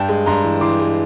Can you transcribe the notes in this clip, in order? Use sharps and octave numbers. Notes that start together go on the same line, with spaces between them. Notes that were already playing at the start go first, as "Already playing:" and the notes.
Already playing: G2 G5 A5
G#3
G2 A#5 C6
E3
E3 C6 D6
G#3